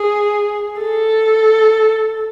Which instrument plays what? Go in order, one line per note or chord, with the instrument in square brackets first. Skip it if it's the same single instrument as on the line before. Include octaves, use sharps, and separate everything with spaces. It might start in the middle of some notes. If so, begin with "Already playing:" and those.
Already playing: [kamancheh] G#4
A4